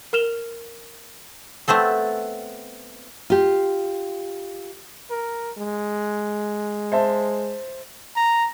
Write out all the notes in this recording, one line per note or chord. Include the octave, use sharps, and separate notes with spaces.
A#4 F6 E7 F7 G7
A3 B3 C4 A4
F4 G4
A#4
G#3
C5 E5 A5
A#5